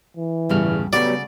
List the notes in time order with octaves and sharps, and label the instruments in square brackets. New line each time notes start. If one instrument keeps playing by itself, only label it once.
[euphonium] E3
[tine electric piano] G1 E2 F6 [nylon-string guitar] A2 C#3 G3
[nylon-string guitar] C#3 A3 F#4 [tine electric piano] F#3 G3 [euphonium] B3 [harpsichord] D5